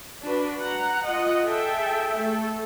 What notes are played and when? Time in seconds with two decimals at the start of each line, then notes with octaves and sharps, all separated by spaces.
0.25 D4 F#4 B4
0.62 F#5 A#5
1.06 F4 D#5 F#5
1.45 G#4 A4 E5 G5
2.18 A3 A4